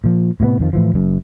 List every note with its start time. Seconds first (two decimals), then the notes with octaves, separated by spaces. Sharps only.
0.04 A#2 F3
0.40 A2 C3 A#3 B3
0.59 F2 D#3 F3
0.73 A2 E3 F3
0.94 F#1 F#2